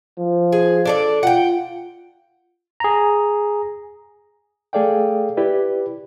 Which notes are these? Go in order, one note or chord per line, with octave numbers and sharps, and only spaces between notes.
F3
G#4
D4 A4 D5
F4 F#5 G5
G#4 A#5
A3 G#4 A4 D5 F5 G5
E4 G4 B4 D5